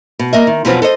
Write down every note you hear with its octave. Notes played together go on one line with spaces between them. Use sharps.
B2
A#3 D#5 E5
D#3
E2 B2 F3 F#3 C4 B4
A4 C5 D#5